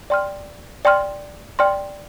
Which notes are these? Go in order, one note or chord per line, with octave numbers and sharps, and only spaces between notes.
D5 G5 C6 F6
D5 G5 C6 F6
D5 G5 C6 F6